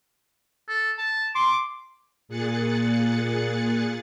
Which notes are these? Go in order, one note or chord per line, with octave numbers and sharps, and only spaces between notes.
A4
A5
C6 D6
A#2 G#4 F#6 A6 C#7